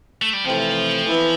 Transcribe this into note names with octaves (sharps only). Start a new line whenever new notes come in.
A3
G3
C3 E3 F3 A3 C4
E3 B3 E4